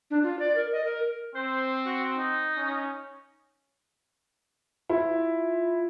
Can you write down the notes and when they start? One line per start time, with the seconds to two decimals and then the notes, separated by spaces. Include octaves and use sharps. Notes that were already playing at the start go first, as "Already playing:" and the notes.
0.10 D4
0.23 F4
0.39 D5
0.55 A#4
0.72 D#5
0.85 A#4
1.35 C4 C5
1.86 F#4
2.18 D#4
2.57 C#4
4.89 E4 F4